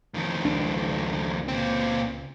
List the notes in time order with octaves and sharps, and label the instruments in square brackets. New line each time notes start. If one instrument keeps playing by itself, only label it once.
[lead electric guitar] F2 D#3
[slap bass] C#2 D4
[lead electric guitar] A#2 C4